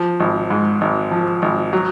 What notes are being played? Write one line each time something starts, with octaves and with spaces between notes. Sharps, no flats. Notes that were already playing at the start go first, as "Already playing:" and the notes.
Already playing: F3
G#1
G#2
G#1
F3
G#1
F#3